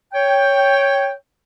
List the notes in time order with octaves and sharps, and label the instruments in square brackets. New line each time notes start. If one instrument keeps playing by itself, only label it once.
[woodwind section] C#5 G5